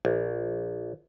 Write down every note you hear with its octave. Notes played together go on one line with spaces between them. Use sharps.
A#1